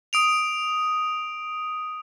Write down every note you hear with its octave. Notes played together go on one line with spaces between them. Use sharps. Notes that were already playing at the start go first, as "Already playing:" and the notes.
D#6 D7 F7